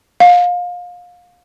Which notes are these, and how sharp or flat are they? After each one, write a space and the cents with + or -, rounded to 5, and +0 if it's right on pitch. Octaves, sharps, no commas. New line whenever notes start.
F5 +30